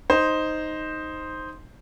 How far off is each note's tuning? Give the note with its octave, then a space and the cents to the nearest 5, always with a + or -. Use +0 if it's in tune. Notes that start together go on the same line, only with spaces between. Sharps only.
D#4 +0 C5 +0